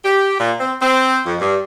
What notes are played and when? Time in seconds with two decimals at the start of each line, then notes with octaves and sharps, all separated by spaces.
0.05 G4
0.40 A#2
0.60 C4
0.82 C4
1.26 F2
1.41 G2